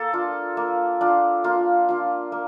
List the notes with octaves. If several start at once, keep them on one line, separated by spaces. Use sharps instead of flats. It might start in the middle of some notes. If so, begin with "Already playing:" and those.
Already playing: A#3 A4
D4 F4
A#3
D4 F4
A#3 F4
D4 F4
A#3